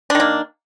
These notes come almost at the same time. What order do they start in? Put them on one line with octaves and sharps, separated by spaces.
D4 D#3 A#3